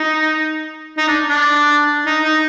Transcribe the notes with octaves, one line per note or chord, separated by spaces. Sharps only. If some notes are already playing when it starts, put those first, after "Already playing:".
Already playing: D#4
D#4
D4
D4
D#4
D#4